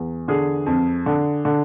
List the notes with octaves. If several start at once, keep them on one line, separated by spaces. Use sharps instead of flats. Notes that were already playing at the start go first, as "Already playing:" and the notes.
Already playing: E2
D3 G#4
F2
D3
D3